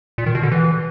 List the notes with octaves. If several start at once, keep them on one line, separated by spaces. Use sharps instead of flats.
A#2
D#3
B2
D3
E3